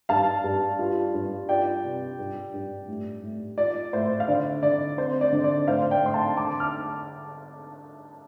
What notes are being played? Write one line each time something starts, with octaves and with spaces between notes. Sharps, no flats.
G2 F5 A5
G2
F4
G2
F4 D5 G5
C3
G2
G2
A2
A2
F4 D5
A2 C5
F5
D3 D5
D3 D5
C4 C5
D5
D3
D5
A2 C5 F5
D5 G5
A2 C6
F5 A5
D3 A5 D6
F6